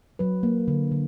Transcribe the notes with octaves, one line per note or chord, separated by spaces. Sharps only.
F#3 B4
A#3
D3
D3